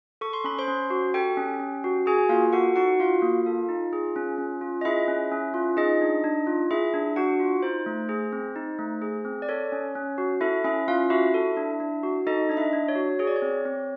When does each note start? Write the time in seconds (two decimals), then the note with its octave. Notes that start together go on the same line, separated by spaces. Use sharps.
0.21 A4 C#6
0.33 C6
0.44 C#4 B5
0.59 C5 C6
0.68 C#4
0.90 F#4
1.14 G4 A4 G5
1.37 C#4
1.60 C#4
1.84 F#4
2.06 F#4 G#4 G#5
2.29 A#3 F4 F5
2.53 F#4 A4 F#5
2.76 D#4 F#4 F#5
3.00 F4 F#4 F5
3.22 A#3
3.46 A4
3.69 D#4
3.93 G#4
4.16 C#4
4.38 C#4
4.61 F4
4.81 D#5
4.85 E4 G#4 E5
5.08 C#4
5.32 C#4
5.54 F4
5.77 D#4 G#4 D#5
6.01 D4
6.24 D4
6.47 F4
6.71 E4 G#4 E5
6.94 D4
7.16 D4 F#4 F#5
7.40 F4
7.62 D#4 C5
7.86 A3
8.09 G#4
8.32 C4
8.56 D#4
8.79 A3
9.02 G#4
9.25 C4
9.42 D5
9.49 A4 C#5
9.72 C#4
9.95 C#4
10.18 F#4
10.41 E4 A4 E5
10.64 C#4 E4 E5
10.88 C#4 F4 F5
11.10 E4 F#4 E5
11.34 A4
11.57 D4
11.80 D4
12.03 F#4
12.27 D#4 A4 D#5
12.49 D4 D#5
12.57 E4 E5
12.73 D4
12.88 C#5
12.95 F#4
13.19 G#4 C#5
13.27 D5
13.36 C#5
13.42 C4
13.65 C4